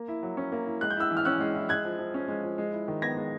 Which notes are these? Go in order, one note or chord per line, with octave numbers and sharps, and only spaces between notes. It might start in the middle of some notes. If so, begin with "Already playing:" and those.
Already playing: A#3
E4
F#3
C#4
A#3
E4
G#3 F#6
G6
E4 E6 F#6
E3
F6
C#4 E6 F#6
G#3
E4
G#3 F#6 G#6
F3
F3
C#4
G#3
F3
G#3
E4
D#3
B3 G#6 A#6
G#3